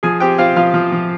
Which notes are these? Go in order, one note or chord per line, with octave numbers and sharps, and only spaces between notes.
F3 G#4 G#5
C4 G4 G5
C4 F4 F5
F3 F4 F5
F3
F3